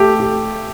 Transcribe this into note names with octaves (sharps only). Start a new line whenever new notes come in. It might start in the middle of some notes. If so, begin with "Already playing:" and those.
Already playing: A3 G4 A4
G4